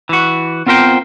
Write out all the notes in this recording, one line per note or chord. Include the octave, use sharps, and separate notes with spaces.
E3 F#4
B3 C4 F4 A#4 C5 G5